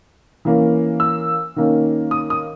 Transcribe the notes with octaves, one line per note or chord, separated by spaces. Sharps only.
E3 A#3 C#4
E6
D#3 A#3 C#4
D#6
D#6